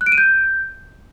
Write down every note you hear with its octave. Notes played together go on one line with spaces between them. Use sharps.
F#6
D7
D#7
G6